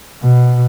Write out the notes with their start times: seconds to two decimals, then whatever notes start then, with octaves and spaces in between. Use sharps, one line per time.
0.22 B2